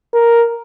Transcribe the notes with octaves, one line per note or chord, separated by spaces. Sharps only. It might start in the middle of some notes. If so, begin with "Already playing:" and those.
A#4